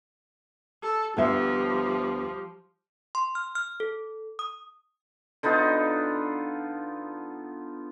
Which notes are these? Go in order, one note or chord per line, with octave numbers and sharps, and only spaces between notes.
A4
D2 F3 G3 B3 E5
C6
F6
F6
A4
D#6
D3 B3 D#4 F4